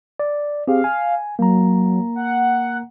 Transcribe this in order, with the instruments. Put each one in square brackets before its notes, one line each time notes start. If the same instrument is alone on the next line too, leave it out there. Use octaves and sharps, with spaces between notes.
[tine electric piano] D5
[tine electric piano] C4 G4 G#4 [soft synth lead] F5
[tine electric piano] G#5
[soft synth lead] F#3 [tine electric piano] A#3 A#5
[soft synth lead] F#5